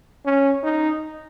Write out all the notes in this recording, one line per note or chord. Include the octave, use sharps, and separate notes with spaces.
C#4
D#4